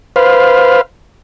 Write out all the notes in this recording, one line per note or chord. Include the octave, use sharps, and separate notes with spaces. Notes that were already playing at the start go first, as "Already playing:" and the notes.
B4 C5 F5